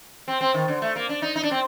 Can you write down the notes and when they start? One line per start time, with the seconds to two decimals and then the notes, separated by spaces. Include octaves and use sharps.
0.28 C4
0.41 C4
0.54 D#3
0.68 D3
0.82 A3
0.96 A#3
1.09 D4
1.22 D#4
1.36 D#4
1.43 D4
1.51 C4